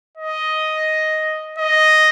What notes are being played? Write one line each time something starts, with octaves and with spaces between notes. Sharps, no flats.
D#5
D#5